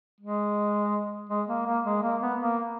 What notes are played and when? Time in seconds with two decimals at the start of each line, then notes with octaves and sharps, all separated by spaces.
0.21 G#3
1.30 G#3
1.48 A#3
1.66 A#3
1.85 G#3
2.03 A#3
2.21 B3
2.39 A#3